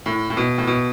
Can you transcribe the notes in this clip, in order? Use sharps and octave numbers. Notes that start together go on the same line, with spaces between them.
A2
A2
B2
A2
B2